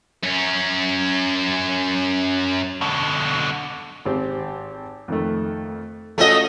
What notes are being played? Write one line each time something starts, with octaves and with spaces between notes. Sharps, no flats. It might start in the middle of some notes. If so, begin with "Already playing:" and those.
F#2 C#4
B2 D3
G#1 C4 G4
F2 D#3 A3
A3 C#4 F4 F#4 D#5